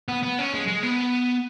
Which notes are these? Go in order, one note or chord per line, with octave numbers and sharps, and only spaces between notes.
B3
B3
C#4
G#3
G#3
B3